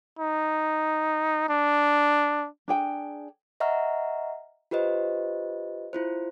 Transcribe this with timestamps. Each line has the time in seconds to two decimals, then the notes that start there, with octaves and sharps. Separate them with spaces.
0.19 D#4
1.49 D4
2.68 D4 G#4 G5
3.60 D#5 E5 F#5 A#5 C#6 F6
4.71 F4 G4 B4 C5 D#5
5.93 E4 F4 C5